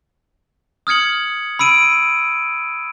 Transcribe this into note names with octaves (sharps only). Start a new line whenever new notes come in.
D#6 F6 G#6 C#7 F#7
B5 E6 D7 D#7